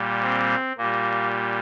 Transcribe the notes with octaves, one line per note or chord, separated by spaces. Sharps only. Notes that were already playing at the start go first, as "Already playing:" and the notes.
Already playing: A#2 G3
C4
A#2 G3 A#3